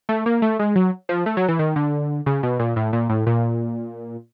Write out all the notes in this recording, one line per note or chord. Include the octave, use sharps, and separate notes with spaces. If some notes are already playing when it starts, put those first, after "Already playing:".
A3
A#3
A3
G#3
F#3
F3
A3
F#3
E3
D#3
D3
C#3
B2
A#2
A2
A#2
A2
A#2